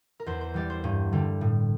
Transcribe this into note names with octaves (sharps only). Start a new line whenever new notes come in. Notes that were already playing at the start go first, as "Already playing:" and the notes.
A#4
E2 C5
C5
E3 G3 D5
C5
G2
D3 G3
A2